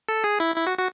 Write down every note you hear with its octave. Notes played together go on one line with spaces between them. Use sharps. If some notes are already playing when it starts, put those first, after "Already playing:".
A4
G#4
E4
E4
F#4
F#4